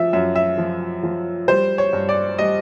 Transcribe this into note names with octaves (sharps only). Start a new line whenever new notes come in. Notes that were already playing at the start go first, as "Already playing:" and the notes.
Already playing: F3 E5
F#2 E5
E5
F3
F3
G3 C5
C#5
G2
D5
G3 D#5